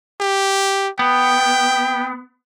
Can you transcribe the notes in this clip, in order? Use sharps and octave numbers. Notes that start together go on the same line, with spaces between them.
G4
B3 G5